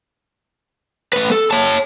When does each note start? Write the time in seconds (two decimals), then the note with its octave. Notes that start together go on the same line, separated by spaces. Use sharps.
1.13 A3 B4
1.32 A4
1.51 C#5 A5